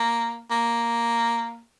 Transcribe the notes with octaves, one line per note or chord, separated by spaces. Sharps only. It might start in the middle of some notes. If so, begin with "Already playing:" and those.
Already playing: A#3
A#3